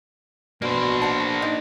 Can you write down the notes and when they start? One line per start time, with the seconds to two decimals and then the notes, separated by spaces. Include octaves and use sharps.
0.62 B2 A#3 D4 C5
1.02 D4 F#5 A5
1.42 D#4